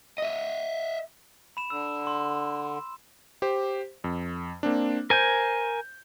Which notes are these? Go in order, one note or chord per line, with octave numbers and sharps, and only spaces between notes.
D#5 E5
B5 E7
D3 E6
C6
G4 C5
F2
A#3 C4 D4
A#4 C5 G#5 G6